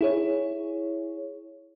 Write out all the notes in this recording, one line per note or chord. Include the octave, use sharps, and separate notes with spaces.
E4 G#4 C#5